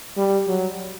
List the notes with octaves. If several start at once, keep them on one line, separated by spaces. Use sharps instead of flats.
G3
F#3